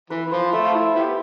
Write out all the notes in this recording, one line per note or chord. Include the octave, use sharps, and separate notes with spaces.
E3 B4
E3
F3 C5
A3 E5
F4
E4
B3 E4 G4